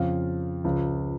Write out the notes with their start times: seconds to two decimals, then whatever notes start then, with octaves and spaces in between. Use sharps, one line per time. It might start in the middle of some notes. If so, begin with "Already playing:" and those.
Already playing: F2 C#3 F3 F5
0.64 C#2 C#3 F3